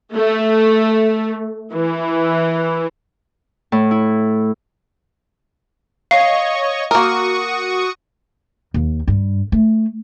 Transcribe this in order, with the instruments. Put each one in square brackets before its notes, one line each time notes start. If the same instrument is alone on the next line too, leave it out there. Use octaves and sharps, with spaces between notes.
[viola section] A3
E3
[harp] A2
E4
[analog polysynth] C#5 D#5 C#6 [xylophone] F5
[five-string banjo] A#3 A#4 [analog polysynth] F#4 C#6 D#6
[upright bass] D#2
G2
A3